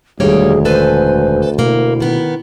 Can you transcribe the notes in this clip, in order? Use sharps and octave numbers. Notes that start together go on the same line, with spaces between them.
E1 D2 D#3 G3 G#3 A#3 G#4 C#5
A4 B4 C5 G#5
B2 A#3 E4
D#3 B3